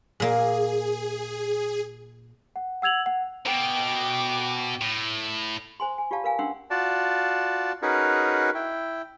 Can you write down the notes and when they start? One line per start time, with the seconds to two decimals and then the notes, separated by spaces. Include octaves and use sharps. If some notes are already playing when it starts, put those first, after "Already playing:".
0.20 A#2 A#3 G#4
2.56 F#5
2.82 F#5 E6 G#6 F7 F#7
3.06 F#5
3.46 B2 G5 D6
4.82 A2
5.80 C5 G#5 C6
5.98 G#5
6.11 F4 G4 D5 F5 A5
6.24 A#4 B4 F5 G#5
6.39 C#4 D4 F#5 G5 C6 E6
6.70 F4 F#4 D5 A5
7.82 C#4 D#4 F#4 G#4 A#4 B4
8.55 E4 G5